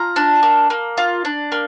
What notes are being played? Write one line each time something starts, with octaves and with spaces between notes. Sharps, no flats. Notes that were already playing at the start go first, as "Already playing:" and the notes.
Already playing: F4 A#5
D4
A#3
A#3
F4
D4
A#3